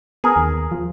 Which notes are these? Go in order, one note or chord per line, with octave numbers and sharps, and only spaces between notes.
B3 G#4 A#4
D#2
F3